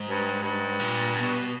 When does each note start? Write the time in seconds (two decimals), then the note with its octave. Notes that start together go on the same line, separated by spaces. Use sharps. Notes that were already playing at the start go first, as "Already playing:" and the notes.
Already playing: G#2
0.08 G2
0.43 G2
0.80 A#2
1.16 B2